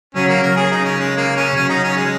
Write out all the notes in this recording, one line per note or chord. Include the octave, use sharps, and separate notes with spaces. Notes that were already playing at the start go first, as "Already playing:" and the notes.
C#3 F#3 C#4
A#3
C#3 A#4
G#4
D#4
C#4
G#3
A#3
C#4
C#3 F#3 C#4
D#4
C#4
G#3